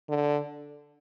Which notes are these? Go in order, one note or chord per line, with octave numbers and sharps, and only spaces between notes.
D3